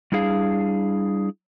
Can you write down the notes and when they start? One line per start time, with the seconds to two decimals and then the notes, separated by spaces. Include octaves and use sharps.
0.12 G3 D4 E4 G#4 F5